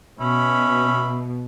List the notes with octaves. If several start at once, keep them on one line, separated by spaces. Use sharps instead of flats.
B2 C#4 E5 B5